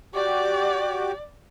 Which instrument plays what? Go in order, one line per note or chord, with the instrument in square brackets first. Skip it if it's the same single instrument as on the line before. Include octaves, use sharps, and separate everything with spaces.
[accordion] F#4 G4 D6 [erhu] D5